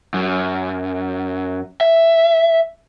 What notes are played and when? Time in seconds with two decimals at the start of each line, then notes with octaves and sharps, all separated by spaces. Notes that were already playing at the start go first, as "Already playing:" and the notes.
0.14 F#2
1.81 E5